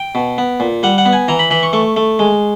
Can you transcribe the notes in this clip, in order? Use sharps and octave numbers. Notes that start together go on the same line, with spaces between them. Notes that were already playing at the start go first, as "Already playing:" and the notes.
Already playing: G5
B2
B3
A#2
G3 F#5
F#5
B3
G#5
E3 A#5
B5
E3 B5
C#6
A3 C#6
A3
G#3